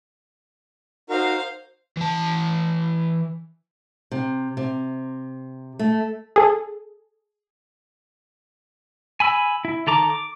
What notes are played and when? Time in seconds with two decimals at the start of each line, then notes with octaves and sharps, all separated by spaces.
1.10 D#4 F#4 A#4 C5 F5
1.97 E3 A5
4.11 C3
4.57 C3
5.79 A3
6.36 G#4 A4
9.20 G#5 B5 E6
9.65 E4
9.87 D#3 A4 A#5 D6
10.10 D6